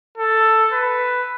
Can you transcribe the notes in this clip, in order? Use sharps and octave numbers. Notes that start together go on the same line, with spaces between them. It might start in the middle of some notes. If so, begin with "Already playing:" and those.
A4
B4